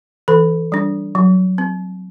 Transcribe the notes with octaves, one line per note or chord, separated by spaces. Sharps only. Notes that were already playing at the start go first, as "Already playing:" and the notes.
E3 A4
G3 D4
F#3
C4